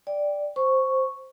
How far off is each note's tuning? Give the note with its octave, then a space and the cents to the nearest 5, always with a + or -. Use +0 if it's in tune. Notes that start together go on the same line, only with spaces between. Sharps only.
D5 +0 G5 +0
C5 +0 C#6 +0